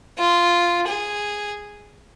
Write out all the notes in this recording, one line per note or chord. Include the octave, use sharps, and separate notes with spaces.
F4
G#4